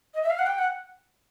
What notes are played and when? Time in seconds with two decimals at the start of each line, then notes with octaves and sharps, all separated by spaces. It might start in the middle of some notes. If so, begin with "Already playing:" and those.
0.14 D#5
0.23 E5
0.30 F5
0.39 F#5
0.46 G5
0.58 F#5